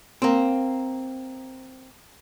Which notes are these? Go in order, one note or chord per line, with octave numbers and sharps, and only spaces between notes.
A#3 C4